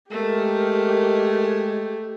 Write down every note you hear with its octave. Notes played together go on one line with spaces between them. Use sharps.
G#3 A3 G4 A#4